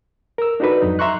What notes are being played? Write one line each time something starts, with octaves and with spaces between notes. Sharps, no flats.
A#4 E6
D4 D#4 F#4 A4 B4
F2 G#2 F#3 D#4
E5 A#5 C6 C#6 F#6